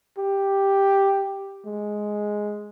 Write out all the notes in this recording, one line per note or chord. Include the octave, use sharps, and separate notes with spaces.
G4
G#3